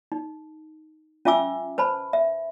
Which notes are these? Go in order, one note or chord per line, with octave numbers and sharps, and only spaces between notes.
D#4
C#4 F4 E5 G#5 D6 E6
B4 C5 A5 B5
E5